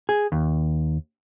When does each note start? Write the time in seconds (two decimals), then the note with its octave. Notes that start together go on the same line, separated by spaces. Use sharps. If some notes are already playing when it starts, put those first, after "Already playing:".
0.09 G#4
0.32 D#2